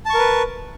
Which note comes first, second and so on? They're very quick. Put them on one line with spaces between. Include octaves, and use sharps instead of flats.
A5 C#6 A#4 B4